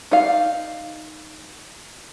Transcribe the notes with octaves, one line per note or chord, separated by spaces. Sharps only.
D#4 D5 F5